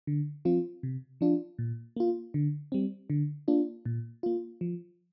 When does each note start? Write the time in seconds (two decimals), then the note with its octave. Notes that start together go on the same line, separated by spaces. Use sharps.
0.07 D3
0.45 F3 C4 F4
0.83 C3
1.21 F3 D4 F4
1.59 A#2
1.96 A#3 F4
2.34 D3
2.72 G3 C4
3.10 D3
3.48 A#3 D4 F4
3.85 A#2
4.23 A#3 F4
4.61 F3